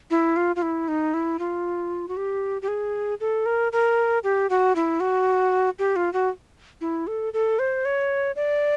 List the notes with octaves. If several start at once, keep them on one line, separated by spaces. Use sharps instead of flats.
E4
F4
F4
E4
D#4
E4
F4
F#4
G4
G4
G#4
A4
A#4
A#4
G4
F#4
E4
F#4
G4
F4
F#4
E4
A4
A4
C5
C#5
D5